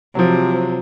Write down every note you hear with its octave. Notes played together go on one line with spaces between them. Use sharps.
C3 F3 F#3